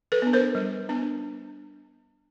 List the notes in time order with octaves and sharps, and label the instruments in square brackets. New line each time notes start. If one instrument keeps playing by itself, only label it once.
[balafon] A4 B4
B3 D4
A#4 C5
G3
B3 D4